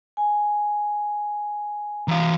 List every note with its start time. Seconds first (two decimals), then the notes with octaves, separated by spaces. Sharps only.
0.17 G#5
2.08 E3 F5 A#5